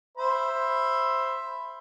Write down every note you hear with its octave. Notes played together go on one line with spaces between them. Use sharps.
C5 E5 B5